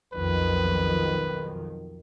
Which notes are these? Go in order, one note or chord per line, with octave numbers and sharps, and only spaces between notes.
B1 F2 D#3 B4